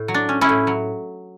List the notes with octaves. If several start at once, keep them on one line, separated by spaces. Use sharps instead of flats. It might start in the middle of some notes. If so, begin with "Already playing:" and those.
Already playing: A2
F#3
D4
C#4
C#4 E4
A2
F#3